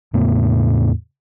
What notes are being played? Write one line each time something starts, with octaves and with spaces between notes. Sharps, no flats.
E2 A2 C#3 A#3